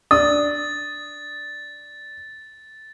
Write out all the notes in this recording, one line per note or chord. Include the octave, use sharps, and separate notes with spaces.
D4 D#6 A6